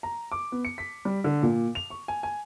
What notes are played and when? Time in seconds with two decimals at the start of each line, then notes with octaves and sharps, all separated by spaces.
0.03 A#5
0.32 D6
0.52 B3
0.65 C#7
0.78 B6
1.05 G3
1.24 D3
1.43 A#2
1.75 F7
1.90 C#6
2.08 G#5
2.23 G#5